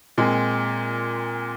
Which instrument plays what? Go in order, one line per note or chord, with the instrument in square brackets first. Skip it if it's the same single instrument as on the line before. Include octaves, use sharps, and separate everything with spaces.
[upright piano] A#2 G#3 C4